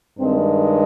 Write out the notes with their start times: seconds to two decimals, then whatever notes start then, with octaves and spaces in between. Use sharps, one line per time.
0.19 G2 D#3 G#3 C4